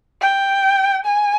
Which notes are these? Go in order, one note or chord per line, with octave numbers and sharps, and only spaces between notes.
G5
G#5